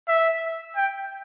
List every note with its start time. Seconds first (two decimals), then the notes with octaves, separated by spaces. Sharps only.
0.08 E5
0.76 G5